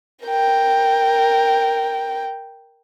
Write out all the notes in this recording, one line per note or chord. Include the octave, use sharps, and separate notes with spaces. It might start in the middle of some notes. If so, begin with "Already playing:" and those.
A#4 G5